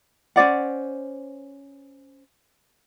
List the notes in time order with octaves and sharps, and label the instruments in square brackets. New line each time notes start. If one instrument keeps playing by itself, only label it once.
[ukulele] C#4 C5 D5 F#5